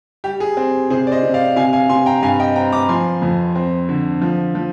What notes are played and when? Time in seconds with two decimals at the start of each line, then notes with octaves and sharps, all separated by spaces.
0.24 G3 G4
0.40 G#4
0.57 C4
0.90 C3 G#4 C5
1.07 D5
1.12 C5 D#5
1.23 C3
1.34 D5 F5
1.56 C3 F5 G#5
1.73 F5 G#5
1.89 C3 G#5 C6
2.06 G5 A#5
2.22 G2 F5 G#5
2.39 D#5 G5
2.56 C4 G5 A#5
2.72 A#5 D6
2.89 F3 G#5 C6
3.22 F2
3.55 C4
3.89 D3
4.22 F3
4.55 F3